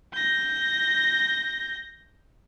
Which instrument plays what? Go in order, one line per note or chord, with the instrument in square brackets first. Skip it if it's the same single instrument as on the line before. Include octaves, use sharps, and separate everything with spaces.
[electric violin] G6 A#6